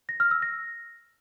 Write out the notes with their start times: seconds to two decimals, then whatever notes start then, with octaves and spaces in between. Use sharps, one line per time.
0.09 A#6
0.20 F6
0.31 E6
0.42 A#6